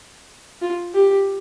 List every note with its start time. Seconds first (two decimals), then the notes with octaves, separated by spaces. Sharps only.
0.62 F4
0.94 G4